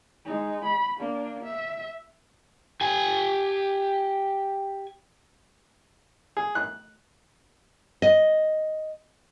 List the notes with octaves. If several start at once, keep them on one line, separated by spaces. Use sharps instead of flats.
G#3 D#4
B5
A#3 D4
E5
G4 G#5
G#4
F#6
D#5